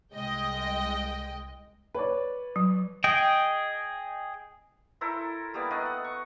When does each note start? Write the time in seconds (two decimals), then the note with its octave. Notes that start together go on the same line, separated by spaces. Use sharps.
0.13 C2 G#3 D#5 G5
1.94 B4 C#5 D5
2.56 F#3
3.04 G#4 D#5 G5
5.01 E4 A4 A#4 C5
5.54 G3 A#3 B3 D5
5.70 A3 D4 D#5 F5
5.86 F#5
6.04 C#6